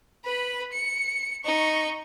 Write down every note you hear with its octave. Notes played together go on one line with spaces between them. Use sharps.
B4 B5
C#7
D#4 C#6